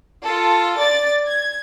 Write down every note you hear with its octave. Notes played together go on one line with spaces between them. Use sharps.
F4 A4
D5 A6
G#6